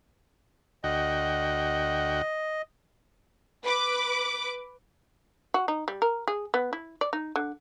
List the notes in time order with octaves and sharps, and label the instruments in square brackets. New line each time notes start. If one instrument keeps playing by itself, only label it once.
[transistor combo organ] D2 F#4 G5 [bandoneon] D#5
[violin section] B4 D6
[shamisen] F#4
D#4
G3
A#4
G#4
B3
E4
D5
D#4
D3